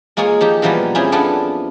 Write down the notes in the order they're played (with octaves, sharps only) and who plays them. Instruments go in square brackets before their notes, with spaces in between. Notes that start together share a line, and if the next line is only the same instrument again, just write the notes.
[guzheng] G#3 A#3 F4 G#4 C#5 G#5
F3 D#4 G4
A#2 E3 F3 G3 A#3 B3
C4 C#4 E4 F4 G4 G#4
F2 F3 B3 D4 E4 F4